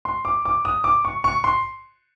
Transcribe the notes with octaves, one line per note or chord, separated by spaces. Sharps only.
C6
D6
D6
D#6
D6
C#6
C#6
C6